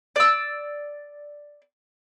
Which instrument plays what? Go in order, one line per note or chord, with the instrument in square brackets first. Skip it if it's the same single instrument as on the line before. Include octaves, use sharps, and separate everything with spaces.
[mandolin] D5 E6